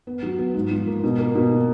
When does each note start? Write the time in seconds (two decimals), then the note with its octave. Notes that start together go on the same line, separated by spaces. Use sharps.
0.07 B3
0.23 F#3
0.39 B3
0.55 G#2
0.71 F3
0.87 A#3
1.04 B2
1.19 A#3
1.35 B2